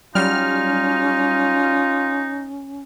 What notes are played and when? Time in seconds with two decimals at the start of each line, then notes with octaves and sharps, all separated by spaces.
0.15 F#3 G3 C#4 D#4 F4 F6